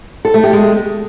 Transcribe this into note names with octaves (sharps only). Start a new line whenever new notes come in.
A4
A3
G4
G#3